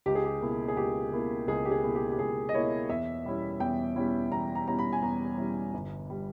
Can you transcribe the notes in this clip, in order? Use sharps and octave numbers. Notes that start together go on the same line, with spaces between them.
C#2 G4
G#4
G4
B2 A#3 E4
G#4
C#2 G4
B2 A#3 E4
C#2 G#4
G4
G#4
B2 A#3 E4
G4
G4
C#2 G#4
D#5
B2 A#3 E4 C#5
E2 E5
B2 G3 C#4 E4
E2 G5
B2 G3 C#4 E4
E2 A#5
A#5
B2 G3 C#4 E4 A#5
B5
G#5
E2 A#5
B2 G3 C#4 E4
G1
G3